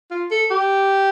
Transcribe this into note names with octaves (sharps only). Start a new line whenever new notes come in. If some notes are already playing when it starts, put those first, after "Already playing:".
F4
A4
G4